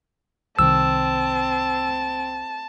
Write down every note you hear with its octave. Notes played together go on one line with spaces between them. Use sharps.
C2 C3 D#3 C4 A5 E6